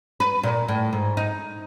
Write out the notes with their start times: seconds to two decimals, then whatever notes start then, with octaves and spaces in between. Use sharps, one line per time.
0.20 B4
0.43 A#2
0.68 A2
0.93 G#2
1.17 D#4